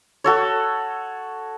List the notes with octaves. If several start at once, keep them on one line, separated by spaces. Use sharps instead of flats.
F#4 A4 C#5